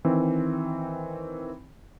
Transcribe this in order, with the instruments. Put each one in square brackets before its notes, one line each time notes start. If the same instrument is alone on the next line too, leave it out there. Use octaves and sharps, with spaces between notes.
[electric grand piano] D#3 E3 C4